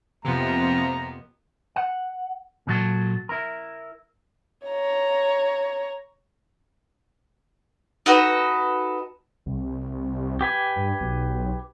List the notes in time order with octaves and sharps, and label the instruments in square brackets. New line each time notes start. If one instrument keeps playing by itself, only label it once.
[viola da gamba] F2 A#3 B3 [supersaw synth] C3 F3 [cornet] A#5
[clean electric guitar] F#5
A#2 F#3 A4
E4 A#4
[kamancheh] C#5 A#5
[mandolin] D#4 F#4 A4 B4
[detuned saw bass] C2
[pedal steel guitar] G4 B4 G#5
[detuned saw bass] G2
B1